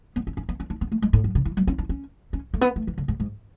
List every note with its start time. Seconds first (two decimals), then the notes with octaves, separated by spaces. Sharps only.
0.16 B3
0.27 C#4
0.37 C#4
0.49 B3
0.60 C#4
0.70 D4
0.81 B3
0.92 A3
1.02 G#3
1.13 A2
1.24 F#2
1.35 C#3
1.45 E3
1.57 F#3
1.67 C#4
1.78 D4
1.89 C#4
2.33 C#4
2.54 A3
2.61 B3
2.76 A3
2.87 E3
2.98 D3
3.08 G#2
3.20 G#2